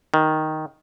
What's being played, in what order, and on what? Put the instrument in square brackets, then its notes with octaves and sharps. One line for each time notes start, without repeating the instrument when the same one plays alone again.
[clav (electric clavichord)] D#3